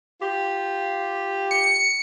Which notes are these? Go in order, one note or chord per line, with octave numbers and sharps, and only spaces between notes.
F4 G4
C#7